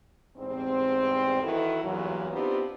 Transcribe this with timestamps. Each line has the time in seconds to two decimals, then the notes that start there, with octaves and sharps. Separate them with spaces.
0.36 E2 G#2 G3 C4
1.42 D#3 E3 E4 F#4 A4
1.83 E2 G2 A#2 E3 F#3
2.32 B3 C4 D4 D#4 F4 G4